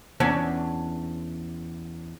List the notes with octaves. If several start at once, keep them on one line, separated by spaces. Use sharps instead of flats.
E2 C#4 D4